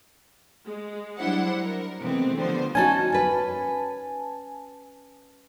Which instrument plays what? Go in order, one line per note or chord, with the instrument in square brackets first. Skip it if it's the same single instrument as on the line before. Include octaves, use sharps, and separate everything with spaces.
[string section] G#3
F#3 G3 D4 E4 C5 F#5
A#4
C3 E3 G#3 A3 B3 C4
D3 F3 G3 B3 C5
[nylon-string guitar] C#4 D#4 F#4 [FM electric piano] G#5 A5
[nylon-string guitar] C#4 B4